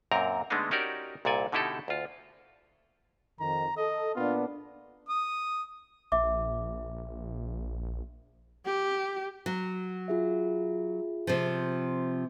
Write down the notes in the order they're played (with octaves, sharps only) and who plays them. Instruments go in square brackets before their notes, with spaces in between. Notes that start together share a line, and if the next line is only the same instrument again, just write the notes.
[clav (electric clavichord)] F#2 A#2 C4 A#4 A#5
D3 G#3 A3 B3 D4 D#4
C#4 D#4 F#4 G4 A#4 D5
C2 A#2 A4 D5 G#5
B2 D3 D#4 E4 G4 A4
D2 F4
[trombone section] F2 D#3 [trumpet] A#5
[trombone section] A4 [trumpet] D#5
[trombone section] A#2 B3 D4 [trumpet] F4
[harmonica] D#6
[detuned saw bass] A#1 [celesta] E5 D6
[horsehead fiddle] G4
[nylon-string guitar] F#3
[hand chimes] F4 G#4 E5
[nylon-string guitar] C3 F3